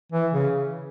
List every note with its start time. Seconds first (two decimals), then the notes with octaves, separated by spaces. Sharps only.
0.12 E3
0.33 C#3